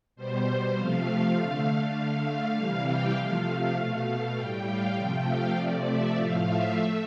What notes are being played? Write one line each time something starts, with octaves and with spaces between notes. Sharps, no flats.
B2 G3 C5
C3 F3 A3 F5
F5
D3 A3 F5
F5
D3 A3
F5
C3 E3 G3
G5
C3 F3 A3 F5
B2 A3 F5
A2 G3 G5
F5
C3 F3 A3 G5
F5
C3 F3 A3 D5
E5
A2 F3 A3 F5
E5
A3